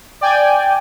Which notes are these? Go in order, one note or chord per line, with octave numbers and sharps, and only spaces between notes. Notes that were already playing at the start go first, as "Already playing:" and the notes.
D5 G5 G#5